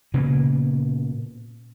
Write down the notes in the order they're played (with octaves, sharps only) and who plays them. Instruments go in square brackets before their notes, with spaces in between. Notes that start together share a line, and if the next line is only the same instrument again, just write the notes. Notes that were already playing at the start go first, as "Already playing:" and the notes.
[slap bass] A#2 C#3 A#3 B3